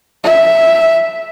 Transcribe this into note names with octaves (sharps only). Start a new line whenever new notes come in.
E5